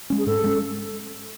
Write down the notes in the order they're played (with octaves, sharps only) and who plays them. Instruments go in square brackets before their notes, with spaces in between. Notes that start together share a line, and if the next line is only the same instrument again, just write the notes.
[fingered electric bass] G#3 C#4
[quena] G#4
[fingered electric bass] G#2 [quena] A4
[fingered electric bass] G#3 C#4